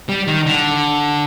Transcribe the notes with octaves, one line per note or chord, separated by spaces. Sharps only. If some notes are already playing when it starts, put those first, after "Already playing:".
G3
D#3
D3